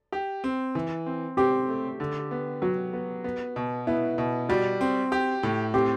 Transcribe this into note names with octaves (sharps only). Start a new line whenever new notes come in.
G4
C4
E3
C4
C4 G4
A3
D3
B3
F#3 F#4
B3
B3
B2
B3 E4
B2
G3 F#4
C4
G4
A2
C4 G4